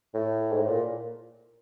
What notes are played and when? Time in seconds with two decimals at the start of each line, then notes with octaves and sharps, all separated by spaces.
0.14 A2
0.53 G#2
0.60 A2
0.68 A#2